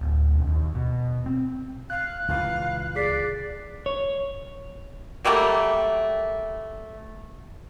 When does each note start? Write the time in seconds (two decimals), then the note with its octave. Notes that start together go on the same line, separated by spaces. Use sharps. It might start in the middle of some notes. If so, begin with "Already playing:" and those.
0.01 D1
0.35 E1
0.48 D#2
0.75 B2
1.26 C4
1.90 F5 F#6
2.28 C#2 A#2 E3 F5
2.96 G#4 D5 B6 C7
3.86 C#5
5.25 F#3 G3 A3 A#3